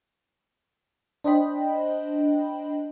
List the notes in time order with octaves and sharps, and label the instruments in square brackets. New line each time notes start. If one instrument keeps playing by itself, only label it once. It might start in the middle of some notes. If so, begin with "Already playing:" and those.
[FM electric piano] D4 C5 D#5 G5 B5